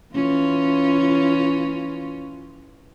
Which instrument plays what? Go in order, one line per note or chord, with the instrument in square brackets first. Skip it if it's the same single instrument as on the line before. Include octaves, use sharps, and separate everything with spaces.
[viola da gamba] E3 C#4 F4